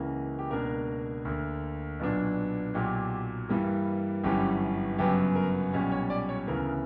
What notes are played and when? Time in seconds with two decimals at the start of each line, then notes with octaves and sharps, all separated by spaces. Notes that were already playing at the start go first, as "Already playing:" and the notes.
Already playing: C#2 C#3 E3 A#3 C#4
0.39 G4
0.50 C#2 B2 A#3 D4 A#4
1.25 D2 D3 A#3
2.00 B1 A#2 F#3 B3 D4
2.74 B1 A#2 F#3 G4
3.49 G2 E3 G3 A#3
4.24 G1 F#2 E3 G3 C#4 G4
4.98 G1 F#2 C#3 F#3 B3 G4
5.35 A#4
5.73 B1 A#2 G3 C#4
5.92 C#5
6.10 D5
6.29 C#5
6.47 D2 C#3 E3 B3 A#4